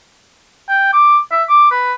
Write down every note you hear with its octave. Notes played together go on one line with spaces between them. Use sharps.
G5
D6
E5
D6
B4